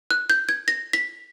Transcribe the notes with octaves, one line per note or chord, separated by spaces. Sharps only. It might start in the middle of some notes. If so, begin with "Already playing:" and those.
F#6
G6
G#6
A#6
B6